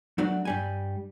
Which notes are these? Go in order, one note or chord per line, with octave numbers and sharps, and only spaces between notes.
F#3 A3 D4 F#4
G2 G3 G#5